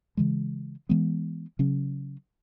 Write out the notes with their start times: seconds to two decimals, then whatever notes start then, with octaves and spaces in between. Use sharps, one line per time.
0.17 C#3 E3 G#3
0.89 E3 G#3 B3
1.59 C#3 F#3 C#4